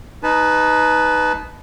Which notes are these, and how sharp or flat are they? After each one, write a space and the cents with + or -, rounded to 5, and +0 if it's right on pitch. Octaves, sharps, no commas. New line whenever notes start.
D#4 +0 B4 +5 A5 -30